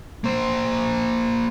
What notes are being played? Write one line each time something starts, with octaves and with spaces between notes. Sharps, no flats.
A#3 C5